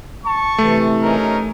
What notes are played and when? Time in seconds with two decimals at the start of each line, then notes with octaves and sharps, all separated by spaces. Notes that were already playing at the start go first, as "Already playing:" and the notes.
0.24 A5 C#6
0.58 C3 E3 A3
1.03 C#4 D#4 A#4